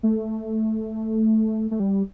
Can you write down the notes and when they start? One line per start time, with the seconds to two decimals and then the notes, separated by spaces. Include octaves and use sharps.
0.03 A3
1.71 A3
1.80 G3